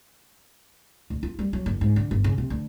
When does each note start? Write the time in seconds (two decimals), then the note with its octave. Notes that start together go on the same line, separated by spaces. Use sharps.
1.10 D2
1.23 F4
1.39 G3
1.53 F#3
1.66 F#1
1.81 G#2
1.96 D3
2.11 G1
2.24 C#3
2.38 C3
2.50 D2